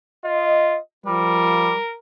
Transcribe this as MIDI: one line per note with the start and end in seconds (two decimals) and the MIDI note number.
0.25 0.78 65
0.25 0.77 75
1.06 1.69 53
1.06 1.76 55
1.06 1.97 70